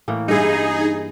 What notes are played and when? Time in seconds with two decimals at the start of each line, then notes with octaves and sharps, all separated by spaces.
0.08 A2 E3 A#3
0.28 G2 D#4 E4 G#4